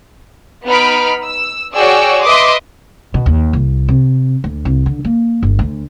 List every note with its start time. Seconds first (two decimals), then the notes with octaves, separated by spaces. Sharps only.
0.66 B3 D#4 B5 F6 D7
1.24 E6
1.75 F#4 G#4 C#5 D5 G5 E6
2.23 B4 D#5 E5 C6 D6 D#6
3.14 B2
3.26 D#2
3.53 C2
3.88 C3
4.44 D2
4.65 C2
4.86 D3
5.05 A#3
5.43 G1
5.59 D2